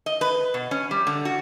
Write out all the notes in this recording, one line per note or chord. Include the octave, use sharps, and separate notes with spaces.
D#5
B4
B2
C#4
G3
D3
F#4